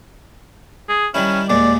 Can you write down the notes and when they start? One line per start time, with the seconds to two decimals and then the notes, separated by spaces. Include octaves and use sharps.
0.89 G#4
1.14 D#3 G3 C#4 E4
1.49 D#2 A#2 G#3 D5